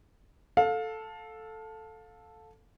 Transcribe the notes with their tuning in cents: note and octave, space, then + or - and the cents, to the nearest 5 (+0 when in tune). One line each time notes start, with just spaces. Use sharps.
A4 +0 F5 +25